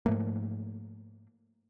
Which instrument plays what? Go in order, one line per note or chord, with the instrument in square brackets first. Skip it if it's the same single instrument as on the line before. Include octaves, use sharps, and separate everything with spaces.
[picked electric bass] G#2 F3 A3 A#3